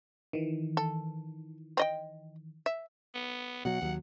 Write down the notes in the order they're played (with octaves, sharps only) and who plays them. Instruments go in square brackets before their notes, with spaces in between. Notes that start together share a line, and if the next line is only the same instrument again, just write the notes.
[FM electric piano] D#3 E3
[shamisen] A4
C4 D#5 G5
E5
[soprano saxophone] B3
[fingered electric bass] B2 F#3 [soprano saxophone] F#5
[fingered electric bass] D#2 F#3